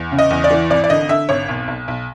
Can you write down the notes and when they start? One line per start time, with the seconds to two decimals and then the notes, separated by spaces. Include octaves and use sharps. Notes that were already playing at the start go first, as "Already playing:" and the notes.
Already playing: E2
0.11 C#3
0.19 D#5
0.30 E2
0.44 D5
0.51 E3
0.70 G#1 D5
0.84 D5
0.90 D3 D#5
1.09 D3 E5
1.29 G#1 C#5
1.49 B1
1.68 B1
1.88 B1